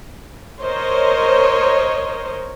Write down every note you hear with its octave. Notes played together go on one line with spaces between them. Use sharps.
A#4 C5 C#5 D#5